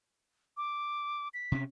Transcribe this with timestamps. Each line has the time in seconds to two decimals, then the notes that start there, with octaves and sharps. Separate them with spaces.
0.57 D6
1.34 B6
1.52 C3 C#4